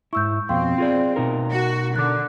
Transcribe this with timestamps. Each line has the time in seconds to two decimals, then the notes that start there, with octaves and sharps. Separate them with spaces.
0.13 G#2 E4 C#6 E6 G6
0.49 F2 B2 C4 F5 G5 C6
0.78 F4 G#4 D5
1.16 B2 D#4 A#4
1.51 F#4
1.96 D3 D6 F#6